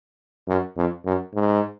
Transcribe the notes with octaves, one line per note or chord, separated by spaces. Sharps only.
F#2
F2
F#2
G#2